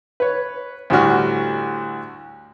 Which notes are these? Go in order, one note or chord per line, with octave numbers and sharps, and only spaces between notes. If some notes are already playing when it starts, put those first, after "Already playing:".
B4 C#5
D2 A2 G3 D4 F#4 F6